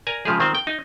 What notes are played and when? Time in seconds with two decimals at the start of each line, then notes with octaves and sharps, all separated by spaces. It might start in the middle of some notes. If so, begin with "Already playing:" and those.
0.07 A#4 D5 G#5 A#5
0.25 C#3 F3 G#3 G4 G#4
0.40 D#3 C4 F4 C5
0.55 G5
0.67 D#4